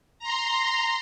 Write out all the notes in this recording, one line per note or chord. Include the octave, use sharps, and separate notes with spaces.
A#5 C6